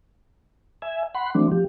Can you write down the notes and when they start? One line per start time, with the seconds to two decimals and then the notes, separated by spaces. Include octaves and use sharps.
0.82 E5 G#5
1.15 F#5 B5 C6
1.35 E3 F#3 A3 C4 D4
1.52 F3 G4